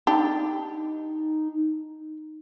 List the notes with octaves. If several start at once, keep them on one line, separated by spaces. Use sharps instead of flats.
D4 D#4 G4